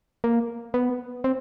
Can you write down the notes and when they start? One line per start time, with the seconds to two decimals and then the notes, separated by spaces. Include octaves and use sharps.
0.24 A#3
0.74 B3
1.24 C4